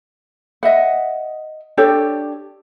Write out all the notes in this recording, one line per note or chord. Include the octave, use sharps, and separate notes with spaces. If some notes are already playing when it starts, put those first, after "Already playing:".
D#5 E5 F#5
D4 G4 A4 C#5